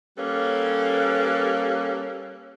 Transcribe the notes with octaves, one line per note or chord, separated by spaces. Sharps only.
G3 A#3 C#4 A4 B4